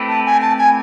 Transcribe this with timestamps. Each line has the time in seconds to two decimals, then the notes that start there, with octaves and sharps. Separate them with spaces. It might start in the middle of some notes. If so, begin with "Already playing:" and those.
Already playing: A3 C4 E4 G4 B4
0.08 A5
0.26 G#5
0.42 A5
0.58 G#5